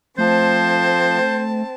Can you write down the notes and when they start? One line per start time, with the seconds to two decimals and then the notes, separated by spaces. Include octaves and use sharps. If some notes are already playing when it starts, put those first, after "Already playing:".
0.18 F3 A3 C4 C5 A5